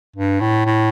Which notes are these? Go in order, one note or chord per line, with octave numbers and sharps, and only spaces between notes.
G2
A2
A2